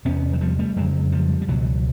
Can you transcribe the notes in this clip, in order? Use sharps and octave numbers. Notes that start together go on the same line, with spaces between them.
E2 C3 B3 C#4
F#3
F3 G3
G3 A3
F2 C#3 F#3 G#3
F3 G3
G3
C#2 B2 E3 F#3